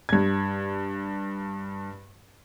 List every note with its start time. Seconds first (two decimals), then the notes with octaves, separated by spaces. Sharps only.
0.09 G2 G#6